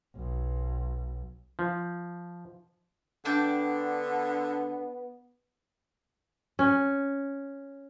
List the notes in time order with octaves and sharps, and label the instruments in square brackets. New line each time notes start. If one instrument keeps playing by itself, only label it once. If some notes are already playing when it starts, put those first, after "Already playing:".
[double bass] B1
[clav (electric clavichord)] F3
[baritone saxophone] D3 [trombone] B3 [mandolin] D4 D5 G5
[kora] C#4